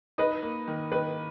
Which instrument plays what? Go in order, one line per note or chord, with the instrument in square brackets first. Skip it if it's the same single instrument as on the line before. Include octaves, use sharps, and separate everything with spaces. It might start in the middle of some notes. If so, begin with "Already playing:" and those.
[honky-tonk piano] D#4 [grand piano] B4 D#5
[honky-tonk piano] A#3
D#3
[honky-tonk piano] D#3 [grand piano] B4 D#5